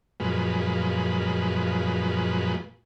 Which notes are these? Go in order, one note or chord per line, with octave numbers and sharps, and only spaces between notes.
F#2 A#2 F3 G#3 B4